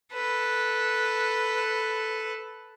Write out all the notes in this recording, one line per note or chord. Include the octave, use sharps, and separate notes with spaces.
A4 B4